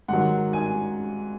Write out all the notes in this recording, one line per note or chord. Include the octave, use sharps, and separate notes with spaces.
G#2 D#3 F#3 F#5
G#5